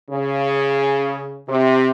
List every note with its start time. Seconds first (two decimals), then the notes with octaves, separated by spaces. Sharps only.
0.10 C#3
1.49 C3